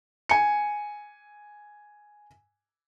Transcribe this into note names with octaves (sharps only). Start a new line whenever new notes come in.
G#5 C#7